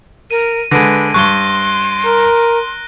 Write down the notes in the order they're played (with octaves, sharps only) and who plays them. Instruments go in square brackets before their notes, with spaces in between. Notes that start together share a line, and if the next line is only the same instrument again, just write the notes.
[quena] A#4 [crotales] D#7
[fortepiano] D3 G#3 [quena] B4 [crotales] A#6 D7 D#7
[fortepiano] G2 C#6 [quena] C6 [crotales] F#6 G7
[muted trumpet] A#4